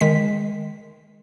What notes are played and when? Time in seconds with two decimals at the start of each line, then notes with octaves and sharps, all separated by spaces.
0.01 D#3 G#3 B6